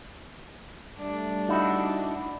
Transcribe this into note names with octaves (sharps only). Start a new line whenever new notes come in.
G3 A3 D4
D#4 E4 F#4